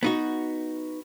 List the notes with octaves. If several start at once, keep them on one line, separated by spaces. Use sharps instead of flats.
B3 D#4 F#4